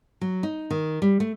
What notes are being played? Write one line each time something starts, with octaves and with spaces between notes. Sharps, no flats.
F#3
D#4
D#3
G3
A3